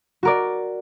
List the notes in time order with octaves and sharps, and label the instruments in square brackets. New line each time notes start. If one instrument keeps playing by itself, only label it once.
[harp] F#4 A#4 D5